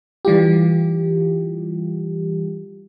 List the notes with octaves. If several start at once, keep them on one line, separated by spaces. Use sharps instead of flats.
E3 G3 F4 G4